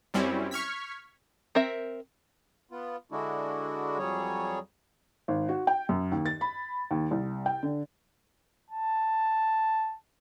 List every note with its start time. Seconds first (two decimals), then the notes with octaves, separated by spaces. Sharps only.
0.14 F#2 G3 C4 C#4 E4
0.51 C#6 F6 G#6 B6
1.55 C4 A#4 E5
2.71 B3 F4
3.12 D3 G#3 D4 E4 F#4
3.98 F2 F#3 G3 G#4 C#5
5.28 G#1
5.49 F#4
5.67 G5
5.89 F#2
6.12 D#2
6.26 A6
6.41 B5
6.91 D#2
7.11 C2
7.46 G5
7.63 D3
8.71 A5